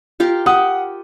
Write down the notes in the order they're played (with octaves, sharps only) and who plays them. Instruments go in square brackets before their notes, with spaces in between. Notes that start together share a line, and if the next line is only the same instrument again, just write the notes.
[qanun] F4 G4 A#4
[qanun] G4 [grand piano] F#5 D#6